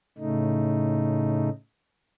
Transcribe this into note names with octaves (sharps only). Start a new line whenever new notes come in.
A2 C#3 A3 D#4